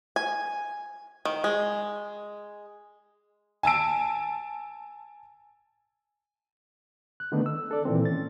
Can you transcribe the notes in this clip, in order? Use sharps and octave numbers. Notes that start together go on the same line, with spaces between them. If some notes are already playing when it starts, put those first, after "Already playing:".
G#5
D#3
G#3
G#5 A5 E6 D7
F#6
D3 D#3 A3 B3 D4 D#4
E6
A4 D5
A#2 D#3 E3 C4
C#4 A6